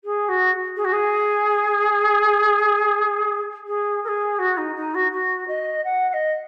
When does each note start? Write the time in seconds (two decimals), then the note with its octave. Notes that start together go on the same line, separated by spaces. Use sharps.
0.04 G#4
0.28 F#4
0.76 G#4
0.84 F#4
0.92 G#4
3.67 G#4
4.03 A#4
4.08 G#4
4.39 F#4
4.57 D#4
4.75 D#4
4.94 F#4
5.11 F#4
5.47 D#5
5.84 F#5
6.08 F#5
6.13 D#5